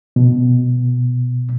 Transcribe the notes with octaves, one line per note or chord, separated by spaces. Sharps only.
B2